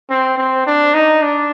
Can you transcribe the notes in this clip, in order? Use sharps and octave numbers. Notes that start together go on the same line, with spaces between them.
C4
C4
D4
D#4
D4